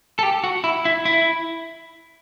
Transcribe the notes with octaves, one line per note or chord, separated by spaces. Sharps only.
A4
G4
F#4
E4
E4
E4